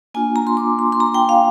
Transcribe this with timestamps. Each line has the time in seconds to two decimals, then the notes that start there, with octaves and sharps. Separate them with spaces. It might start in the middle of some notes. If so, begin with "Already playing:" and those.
0.14 A#3 D4 F4 G#5
0.36 A#5
0.47 C6
0.57 D6
0.79 C6
0.92 C6
1.00 A#5
1.14 G5
1.29 F5